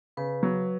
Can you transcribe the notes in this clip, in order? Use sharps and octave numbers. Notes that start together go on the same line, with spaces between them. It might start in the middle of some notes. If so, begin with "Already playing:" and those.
C#3 B4
F#3